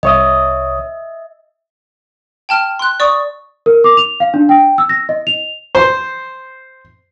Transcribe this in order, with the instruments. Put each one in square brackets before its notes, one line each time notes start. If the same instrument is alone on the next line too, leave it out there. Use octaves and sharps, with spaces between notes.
[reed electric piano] C2 C#5 D#6 [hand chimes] D#5 E5
[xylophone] G5 A5 F6
C6 F#6
D5 C#6 D#6
[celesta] A#4
D6
F7
F5
D4
G5
E6
A#6
D#5
F7
[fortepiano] C5